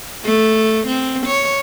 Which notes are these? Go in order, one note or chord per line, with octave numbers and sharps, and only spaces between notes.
A3
C4
C#5